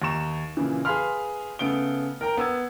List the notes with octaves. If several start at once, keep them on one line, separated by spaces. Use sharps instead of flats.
D#2 A#5 C#6 E7
A#2 C#3 E3
G#4 B4 F5 B5 C6 F6
C#3 A3 B3 D7 G7
A#4 G5 A#5
B3 E6 G#6